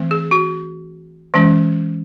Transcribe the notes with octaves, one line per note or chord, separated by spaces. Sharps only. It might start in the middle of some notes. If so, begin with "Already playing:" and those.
Already playing: E3 A3 C4
G#4
F#4
E3 G#3 C#4